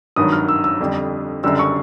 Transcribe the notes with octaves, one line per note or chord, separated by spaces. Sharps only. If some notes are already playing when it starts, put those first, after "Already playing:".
G#1 G2 D#3 F#3 D#6
F6
E6
E6
F2 D3 G3
F#1 F#2 D3 G3 E6
C#6